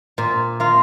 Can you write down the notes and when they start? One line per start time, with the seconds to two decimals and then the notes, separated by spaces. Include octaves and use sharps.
0.18 A#2
0.60 A#3 F4